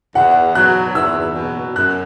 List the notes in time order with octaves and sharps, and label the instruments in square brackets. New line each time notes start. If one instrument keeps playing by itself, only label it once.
[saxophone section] E2 [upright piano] F#5
[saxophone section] B2 F#3 [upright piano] F#6
[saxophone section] E2 [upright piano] E6
[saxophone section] B2 F#3
[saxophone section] F#2 [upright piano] F#6